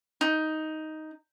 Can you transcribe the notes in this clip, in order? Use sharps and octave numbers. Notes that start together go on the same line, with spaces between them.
D#4